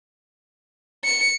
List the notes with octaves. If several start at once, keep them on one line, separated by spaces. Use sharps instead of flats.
C#7